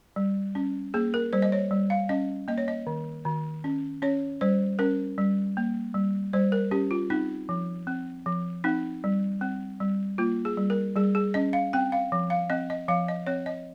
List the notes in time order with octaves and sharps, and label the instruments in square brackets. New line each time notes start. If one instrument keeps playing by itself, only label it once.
[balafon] G3
C#4
A#3 G#4
A#4
G3 C5
D#5
C#5
G3
F5
C#4 D#5
A#3 D#5
C#5
D#5
D#3
D#3
C#4
C#4 C#5
G3 C5
C#4 A#4
G3
A#3
G3
G3 C5
A#4
C#4 G4
F4
C4 D#4
F3
C4
F3
C4 D#4
G3
C4
G3
A#3 F4
G#4
G3
A#4
G3 G#4
G#4
C#4 D#5
F5
C4 G5
F5
F3
F5
C4 D#5
D#5
F3 F5
D#5
C4 C#5
D#5